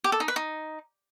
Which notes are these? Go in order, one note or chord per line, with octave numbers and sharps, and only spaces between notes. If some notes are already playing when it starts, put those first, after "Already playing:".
G4
A4
D#4
B4
D#4